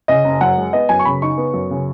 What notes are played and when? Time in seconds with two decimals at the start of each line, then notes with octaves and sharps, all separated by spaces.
0.08 C#3 D#5
0.24 F#1
0.41 F#2 F#5
0.57 G#3
0.73 B3 D#5
0.89 F#2 G#5
1.00 C#6
1.05 C#3 B5
1.22 D#4 C#6
1.38 B3
1.54 F#2
1.71 C#3